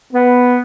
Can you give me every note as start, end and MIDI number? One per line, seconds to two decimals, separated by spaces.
0.13 0.58 59